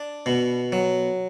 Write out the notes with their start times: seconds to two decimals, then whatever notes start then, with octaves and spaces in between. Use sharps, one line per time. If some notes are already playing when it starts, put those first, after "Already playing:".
Already playing: D4
0.26 B2
0.72 F#3